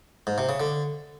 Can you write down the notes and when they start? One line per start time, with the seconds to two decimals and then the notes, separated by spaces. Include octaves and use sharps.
0.27 G#2
0.38 C3
0.49 C#3
0.60 D3